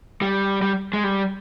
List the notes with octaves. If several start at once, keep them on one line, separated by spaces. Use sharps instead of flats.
G3
G3
G#3
G3